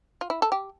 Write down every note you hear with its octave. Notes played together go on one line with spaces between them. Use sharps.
F4
E4
A4
G4